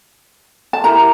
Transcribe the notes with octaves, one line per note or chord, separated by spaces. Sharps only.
A5
E4 G4 A#4 A#5